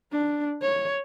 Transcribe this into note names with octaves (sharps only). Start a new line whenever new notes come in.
D4
C#5